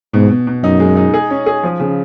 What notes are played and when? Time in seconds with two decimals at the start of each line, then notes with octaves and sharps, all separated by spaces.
0.14 G#2 B2
0.30 B2
0.47 B2
0.63 F#2 D#4
0.80 G#3
0.97 D#4
1.14 G#4
1.30 C#4
1.46 G#4
1.63 F3
1.80 C#3